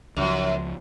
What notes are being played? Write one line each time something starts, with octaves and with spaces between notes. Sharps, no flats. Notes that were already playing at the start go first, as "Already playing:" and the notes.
C#2 F#2 C#3 F3